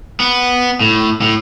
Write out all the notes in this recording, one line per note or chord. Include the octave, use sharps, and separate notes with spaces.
B3
A2
A2